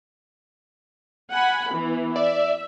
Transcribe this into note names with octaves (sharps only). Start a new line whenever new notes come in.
F#5 G#5 B5
E3 B3
D5 E5